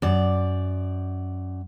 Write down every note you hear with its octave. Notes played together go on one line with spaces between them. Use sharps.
F#2 D5